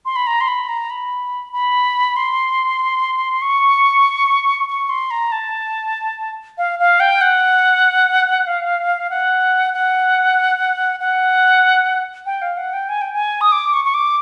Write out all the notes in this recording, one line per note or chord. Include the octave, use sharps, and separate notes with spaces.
C6
B5
A#5
C6
B5
A#5
B5
B5
C6
C#6
C#6
C6
A#5
A5
F5
F5
G5
F#5
F5
F#5
F#5
F#5
G5
F5
F#5
G5
G#5
G5
G#5
D#6
D6
C#6
C#6
D6